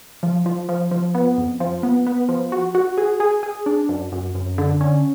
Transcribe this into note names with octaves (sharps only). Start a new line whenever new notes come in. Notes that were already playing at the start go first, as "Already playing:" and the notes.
F3
F3
F3
F3
B3
F2
F3
B3
B3
F3
F#4
F#4
G#4
G#4
G#4
D4
F#2
F#2
F#2
D3
C#4